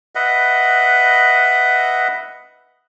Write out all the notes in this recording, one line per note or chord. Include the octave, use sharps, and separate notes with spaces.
B4 D#5 E5 F#5